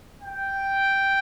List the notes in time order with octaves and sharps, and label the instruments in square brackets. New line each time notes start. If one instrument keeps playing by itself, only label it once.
[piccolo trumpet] G5